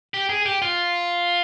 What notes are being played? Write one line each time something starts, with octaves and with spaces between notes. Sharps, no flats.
G4
G#4
G4
F4